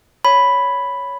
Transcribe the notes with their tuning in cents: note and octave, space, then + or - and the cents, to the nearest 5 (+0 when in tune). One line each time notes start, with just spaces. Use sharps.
C#5 +10 B5 +0